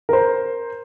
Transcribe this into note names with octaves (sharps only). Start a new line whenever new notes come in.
A#4 C5